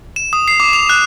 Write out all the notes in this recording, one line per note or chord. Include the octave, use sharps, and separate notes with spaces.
E7
D#6
C7
D6
F7
F#6